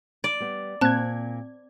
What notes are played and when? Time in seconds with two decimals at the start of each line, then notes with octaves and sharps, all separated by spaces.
0.24 D5
0.40 G3 B3
0.81 A#2 C4 A5 F#6 G#6